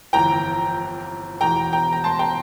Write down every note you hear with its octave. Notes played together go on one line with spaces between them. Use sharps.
G1 F2 E3 G5 A#5
E1 E2 E3 G5 A#5
G5 A#5
A#5
A5 C6
G5 A#5